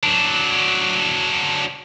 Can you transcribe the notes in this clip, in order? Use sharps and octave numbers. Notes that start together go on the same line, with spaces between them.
F#3 D4